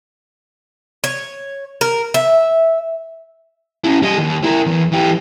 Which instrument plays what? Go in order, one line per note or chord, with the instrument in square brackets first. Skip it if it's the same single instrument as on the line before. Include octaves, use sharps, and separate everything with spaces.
[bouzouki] C#5
A#4
E5
[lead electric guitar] C#4 E4
G3 D#5
D#2
E4 A#4
E2
E3 G4